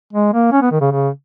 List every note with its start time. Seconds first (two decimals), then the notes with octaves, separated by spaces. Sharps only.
0.13 G#3
0.33 A#3
0.52 C#4
0.62 B3
0.72 D#3
0.81 C#3
0.91 C#3